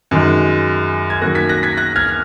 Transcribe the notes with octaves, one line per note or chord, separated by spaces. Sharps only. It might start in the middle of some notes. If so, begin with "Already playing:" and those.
F#2 D#3 G#3
G#6
F#2 D#3 F#3 A#3 F#6 A#6
G#6 B6
F#6 A#6
G#6 B6
F#6 A#6
F6 G#6